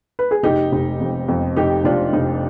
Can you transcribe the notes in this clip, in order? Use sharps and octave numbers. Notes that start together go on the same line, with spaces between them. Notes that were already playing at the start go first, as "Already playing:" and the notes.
B4
G#4
F1 D#4 G4
F1
F2
F2
F1 D#4 G4
F1 D4 F4
F1 D#4